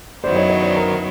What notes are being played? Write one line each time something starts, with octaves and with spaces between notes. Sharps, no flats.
F#2 D#3 F#3 B3 E4 C5 D5
C#5 D#5
C#5 D#5
C5 D5
A#4 C5